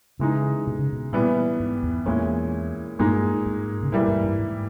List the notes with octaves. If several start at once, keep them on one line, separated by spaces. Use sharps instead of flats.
C#3 E3 G#3 D#4
B2
C#3
B2
A#2 E3 G3 B3
G#2
E2
E2 A#2 G#3 C#4 E4
G2 A#2 G#3 D#4
G#2
C#3
B2 E3 G3 A#3 E4
G#2
G2
G#2